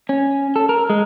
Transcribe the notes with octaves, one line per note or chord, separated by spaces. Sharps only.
C#4
A4
A#4
G#3